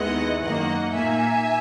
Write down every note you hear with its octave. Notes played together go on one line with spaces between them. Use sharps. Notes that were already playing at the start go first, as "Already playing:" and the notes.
Already playing: D#2 D#3 G#3 B3 E4 D#5 F#5
F#2 D#3 A#3 D#5 F#5
A#2 A#3 D#4 E5 G#5